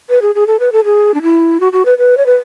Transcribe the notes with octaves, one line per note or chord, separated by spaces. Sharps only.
B4
G#4
G#4
A4
B4
A4
G#4
D4
E4
F#4
F#4
B4
B4
C#5
B4